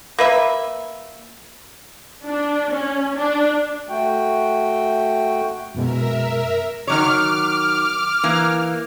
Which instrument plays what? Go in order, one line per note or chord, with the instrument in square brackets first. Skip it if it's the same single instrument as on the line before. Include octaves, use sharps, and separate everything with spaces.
[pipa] A#3 B4 E5
[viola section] D4
C#4
D4
[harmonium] A3 F#4 G5
[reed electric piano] F#2 B2 G#3 [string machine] A#4 E5
[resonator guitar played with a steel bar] D#3 F#3 C#5 [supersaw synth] D6 F6
[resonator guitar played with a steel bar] E3 A#3